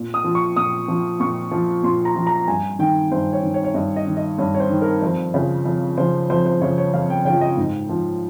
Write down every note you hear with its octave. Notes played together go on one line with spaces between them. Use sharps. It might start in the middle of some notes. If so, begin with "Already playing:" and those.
Already playing: A#2
D#6
F3
C#6
A#2 D#6
F3
A#2 C#6
F3
A#2 C6
A#5
F3
A#5
G2 G#5
D#3 G5
G2 C5
C#5
D#3
C#5
C#5
G2 D#5
D#5
D#3
D#5
G2 C#5
C#5
C5
D#3
A#4
F2 C5
C#3 F3
F2
C#3 F3 C5
F2 C5
C5
C#3 F3 C#5
C#5
F2 F5
G5
C#3 F3 G5
D#5
G#2
F3